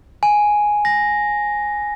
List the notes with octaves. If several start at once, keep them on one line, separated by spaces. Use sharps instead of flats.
G#5
A#6